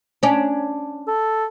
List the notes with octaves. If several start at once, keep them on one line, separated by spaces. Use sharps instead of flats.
C#4 D4
A4